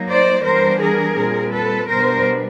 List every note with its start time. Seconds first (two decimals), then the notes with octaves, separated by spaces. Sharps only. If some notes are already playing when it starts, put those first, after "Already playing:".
Already playing: F#3 A#3 D#4
0.09 C5 D5
0.45 E3 G3 B3 D4 A#4 C5
0.80 G#4 A#4
1.17 A#2 G3 C4
1.53 A4 B4
1.89 B2 G3 B3 D4 A#4 C5